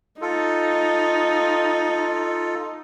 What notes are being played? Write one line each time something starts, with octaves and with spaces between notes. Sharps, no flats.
D#4 F4 A4